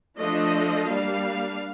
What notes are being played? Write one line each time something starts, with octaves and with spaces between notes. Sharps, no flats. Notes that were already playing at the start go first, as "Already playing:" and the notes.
F3 A3 D4 D#5
G3 A#3 D4 F5